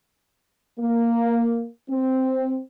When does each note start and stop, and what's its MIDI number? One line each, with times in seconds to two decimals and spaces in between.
0.79 1.67 58
1.90 2.60 60